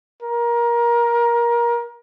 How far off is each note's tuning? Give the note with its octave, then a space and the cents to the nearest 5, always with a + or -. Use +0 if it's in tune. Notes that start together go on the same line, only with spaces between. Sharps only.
A#4 +20